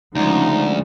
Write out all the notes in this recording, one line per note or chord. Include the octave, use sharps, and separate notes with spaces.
D2 C#3 F3 G#3 D#4